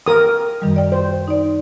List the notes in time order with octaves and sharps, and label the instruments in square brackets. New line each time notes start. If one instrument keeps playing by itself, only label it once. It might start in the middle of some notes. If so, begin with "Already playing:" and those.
[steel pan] A#4 D#6 [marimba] G5
[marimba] F#2 D#3 G3
D5 G5
[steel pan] C5
[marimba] D#4 D5